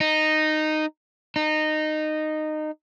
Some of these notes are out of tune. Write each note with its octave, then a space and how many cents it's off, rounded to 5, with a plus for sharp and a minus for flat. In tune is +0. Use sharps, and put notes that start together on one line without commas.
D#4 -10
D#4 -15